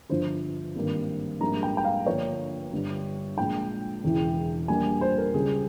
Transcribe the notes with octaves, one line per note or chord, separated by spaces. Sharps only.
G1 G2 F3 C5
G#1 G2 G3 A#3
A#1 G#2 G3 A#3 A#5
G5
G5
F5
G1 G2 F3 A#3 C#5
G1 G2 G3
A#1 A#2 G#3 G5
E1 E2 C#3 E3
A#1 A#2 G3 A#3 G#5
C5
A#4
C#2 C#3 G3 G#4